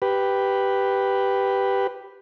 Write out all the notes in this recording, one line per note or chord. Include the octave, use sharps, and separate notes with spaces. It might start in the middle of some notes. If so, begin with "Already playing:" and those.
G4 B4